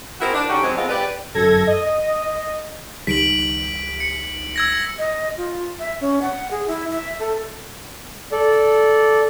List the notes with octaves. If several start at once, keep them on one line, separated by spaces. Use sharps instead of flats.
C4 E4 F#4 G#4 A#4 C5
D4
D3 C#4 D#4 F#4 G4
F#3 G#3 C4
E3 G#3 A3 B3 C4 F4
G4 B4 D5
G1 F#2 A4 G#6 A#6
D#5
C#2 D#3 G3 B6 D7 F#7
C#7
E6 G#6 A#6
D#5
F4
E5
C#4
F#5
G#4
E4
E5
A4
A4 D5